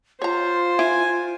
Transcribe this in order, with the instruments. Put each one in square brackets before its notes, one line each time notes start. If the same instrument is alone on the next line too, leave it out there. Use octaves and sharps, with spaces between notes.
[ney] F4 [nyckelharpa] C5 [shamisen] C#5 A#5
[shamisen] E4 [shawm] G#5